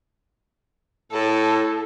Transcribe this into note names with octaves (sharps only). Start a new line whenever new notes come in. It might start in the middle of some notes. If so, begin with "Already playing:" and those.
A2 A4